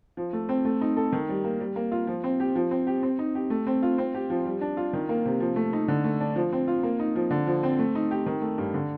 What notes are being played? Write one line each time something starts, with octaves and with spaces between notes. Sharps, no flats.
F3
A3
C4
A3
D#4
A4
D#3
G3
A#3
G3
A#3
F4
F3
C4
G4
F3
C4
G4
C4
D#4
G4
A3
C4
F4
C4
G4
F3
G3
D4
F4
D#3
A#3
C3
F3
A3
D#4
D3
A3
D4
F3
C4
F4
A#3
D#4
F3
D3
F3
C4
A3
D#4
G4
D#3
A3
G2
D3